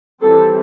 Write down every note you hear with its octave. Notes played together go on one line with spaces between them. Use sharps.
E3 G3 C4 A4